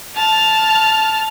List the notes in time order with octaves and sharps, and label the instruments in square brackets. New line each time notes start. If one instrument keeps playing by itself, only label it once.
[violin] A5 F6